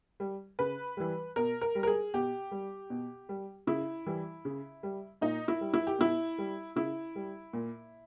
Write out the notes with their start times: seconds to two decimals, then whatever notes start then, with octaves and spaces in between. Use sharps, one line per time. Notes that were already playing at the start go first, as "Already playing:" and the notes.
0.20 G3
0.59 C#3 B4
0.97 E3 G3
1.36 B2 A#4
1.61 A#4
1.75 G3
1.83 A#4
1.87 G#4
2.14 B2 G4
2.51 G3
2.90 B2
3.29 G3
3.67 C#3 E4
4.06 E3 G3
4.45 C#3
4.83 G3
5.21 A#2 D#4
5.48 E4
5.61 G3
5.74 E4
5.87 G4
5.99 B2 E4
6.38 G3
6.76 C#3 E4
7.16 G3
7.53 A#2